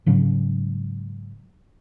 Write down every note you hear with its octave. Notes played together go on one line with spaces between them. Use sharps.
G#2 C#3 F#3 C#4